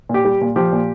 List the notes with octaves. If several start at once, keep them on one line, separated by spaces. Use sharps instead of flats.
A#2 G4
G3
A#2
F3 G4
A#2